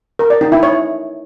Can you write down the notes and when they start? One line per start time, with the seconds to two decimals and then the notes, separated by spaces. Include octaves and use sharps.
0.19 A#4
0.30 D5
0.41 D#4
0.52 E4
0.63 C#5